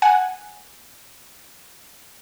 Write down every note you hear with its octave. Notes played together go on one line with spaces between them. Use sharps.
F#5 G#5